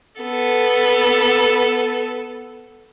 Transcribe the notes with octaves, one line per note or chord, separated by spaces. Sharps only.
B3 A4